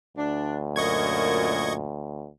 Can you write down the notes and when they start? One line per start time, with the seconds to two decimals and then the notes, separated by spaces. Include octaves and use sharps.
0.17 D2 D4
0.76 F#2 A#2 D#5 C#6 G#6